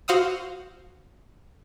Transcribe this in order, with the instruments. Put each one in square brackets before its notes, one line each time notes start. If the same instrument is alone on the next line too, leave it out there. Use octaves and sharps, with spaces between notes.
[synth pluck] F#4 C5 F5 F#5 D#6 E6